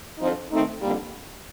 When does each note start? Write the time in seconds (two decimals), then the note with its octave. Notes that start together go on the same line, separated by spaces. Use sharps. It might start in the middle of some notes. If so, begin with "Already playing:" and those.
0.18 F2 D3 F3 C4 D#4
0.50 D#3 A3 C4 D#4
0.81 F2 D3 G3 A#3